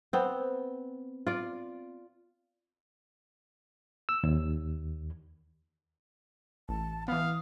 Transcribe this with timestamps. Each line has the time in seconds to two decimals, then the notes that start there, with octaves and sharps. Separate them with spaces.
0.13 B3 C4
1.27 F4 D5
4.09 E6
4.23 D#2
6.69 A1 A5
7.08 E3 B3 F5 D#6